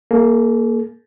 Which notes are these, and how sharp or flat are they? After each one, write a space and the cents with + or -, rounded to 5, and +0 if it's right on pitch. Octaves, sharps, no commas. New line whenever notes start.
A#3 +0 G#4 +45